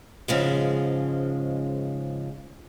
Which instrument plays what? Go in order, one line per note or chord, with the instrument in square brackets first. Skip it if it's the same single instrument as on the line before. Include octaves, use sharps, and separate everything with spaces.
[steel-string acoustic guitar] G#2 C#3 F3 G#3